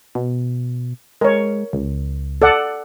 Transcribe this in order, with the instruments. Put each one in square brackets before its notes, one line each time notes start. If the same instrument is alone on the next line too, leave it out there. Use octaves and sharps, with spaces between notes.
[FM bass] B2
[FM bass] G#3 [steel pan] A#4 C#5
[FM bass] C#2
[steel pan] A4 D5 F#5